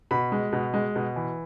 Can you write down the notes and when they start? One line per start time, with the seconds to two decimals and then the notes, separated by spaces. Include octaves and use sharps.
0.11 B2 B5
0.32 G#3
0.53 B2
0.74 G#3
0.96 B2
1.16 E3